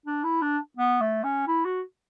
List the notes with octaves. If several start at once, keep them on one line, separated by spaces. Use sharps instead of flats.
D4
E4
D4
B3
A3
C#4
E4
F#4